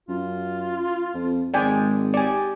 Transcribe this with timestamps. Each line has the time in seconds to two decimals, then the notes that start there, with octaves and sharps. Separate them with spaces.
0.09 F#2 F4
1.14 F2
1.54 G#1 G#3 D5 G5 G#5
2.14 G4 D5 G#5